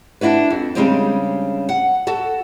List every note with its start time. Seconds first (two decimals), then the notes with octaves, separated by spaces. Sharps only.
0.21 D4 E4 F#4 B4
0.50 F2
0.75 C#3 G3 G#3 C4 D4 D#4
1.69 F#5
2.07 F#4 A4